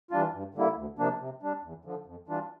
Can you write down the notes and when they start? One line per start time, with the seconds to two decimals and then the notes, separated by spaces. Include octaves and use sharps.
0.11 E3 G3 D4 F4
0.33 G2
0.54 D3 G3 A#3 E4
0.76 D2
0.99 C3 F3 A#3 D4
1.20 C3
1.42 G3 D4
1.63 E2
1.85 D3 F3
2.06 F2
2.28 E3 G3 D4 F4